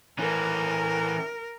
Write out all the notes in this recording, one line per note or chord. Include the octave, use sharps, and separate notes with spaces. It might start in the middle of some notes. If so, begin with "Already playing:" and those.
E3 C#4 A#4